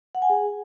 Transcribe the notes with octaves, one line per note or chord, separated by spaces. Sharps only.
F#5
G#5
G#4